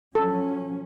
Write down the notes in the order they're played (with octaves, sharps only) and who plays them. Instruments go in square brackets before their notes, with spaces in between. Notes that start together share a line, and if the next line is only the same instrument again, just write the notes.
[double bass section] F3 F#3 C#4 [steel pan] A4